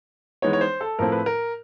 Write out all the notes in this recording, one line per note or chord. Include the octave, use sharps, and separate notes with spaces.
E3 G#3 B3 D#4 C#5
C#5
C5
A4
A2 F3 A3 C4 E4 A#4
B4
A#4